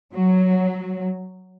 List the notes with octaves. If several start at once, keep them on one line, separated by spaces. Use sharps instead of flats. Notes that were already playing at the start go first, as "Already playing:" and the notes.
F#3